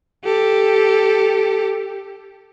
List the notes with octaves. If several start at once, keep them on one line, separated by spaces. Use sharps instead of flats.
G4 A4